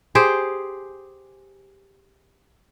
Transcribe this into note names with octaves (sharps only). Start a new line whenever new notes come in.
G4 G#4 C5 G5